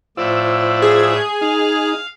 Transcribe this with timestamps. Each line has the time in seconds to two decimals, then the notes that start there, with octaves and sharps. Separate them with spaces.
0.17 A2 F4 C5 D5 E6
0.82 G#4
1.41 D#4 F5